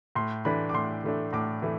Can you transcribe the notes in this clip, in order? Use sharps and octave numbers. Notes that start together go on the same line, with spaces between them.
A2 C6
E3 A3 D4 B5
D6
A2 C6
E3 A3 D4
A2 D6
E3 A3